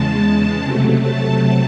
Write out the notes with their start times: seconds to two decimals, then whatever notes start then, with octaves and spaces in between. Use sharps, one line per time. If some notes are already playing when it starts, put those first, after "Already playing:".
Already playing: E2 C#3 G#3 A5
0.64 C3 F#3 A3
1.02 A5